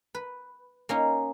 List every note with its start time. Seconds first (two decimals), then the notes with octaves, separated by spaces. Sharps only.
0.15 B4
0.89 A#3 C#4 D#4